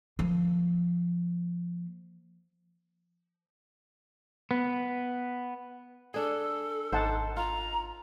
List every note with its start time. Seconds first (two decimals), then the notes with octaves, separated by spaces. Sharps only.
0.19 F3 A#3
4.51 B3
6.14 D4 G#4 A4
6.92 G#1 D#4 C5 F#5 A5
7.37 F4 A#5